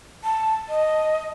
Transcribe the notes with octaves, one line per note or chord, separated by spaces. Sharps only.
A5
D#5